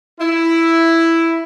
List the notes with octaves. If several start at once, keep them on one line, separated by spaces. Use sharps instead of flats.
E4